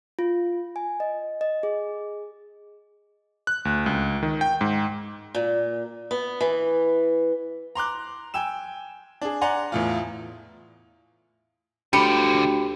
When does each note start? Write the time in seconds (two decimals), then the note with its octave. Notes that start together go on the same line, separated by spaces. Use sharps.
0.19 F4
0.76 G#5
1.00 D#5
1.41 D#5
1.63 G#4
3.47 F#6
3.65 D2
3.86 C#2
4.23 D#3
4.41 G5
4.61 G#2
5.35 A#2
6.11 B3
6.41 E3
7.75 A#5 C6 D6 F#6
8.34 G5 G#5 E6 E7
9.21 D4 G#4
9.41 D5 F#5 G#5 A#5 C6
9.72 E2 A2 F4
11.93 D2 D3 F3 G4 B5 C#7